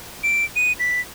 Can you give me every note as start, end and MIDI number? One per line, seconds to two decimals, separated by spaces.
0.24 0.44 98
0.56 0.73 99
0.80 1.01 95